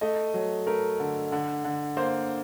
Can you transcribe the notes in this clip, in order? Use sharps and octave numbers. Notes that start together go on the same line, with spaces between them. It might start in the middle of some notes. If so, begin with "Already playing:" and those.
A3 D#5
F#3
A3 A#4
D3
D3
D3
A#3 C5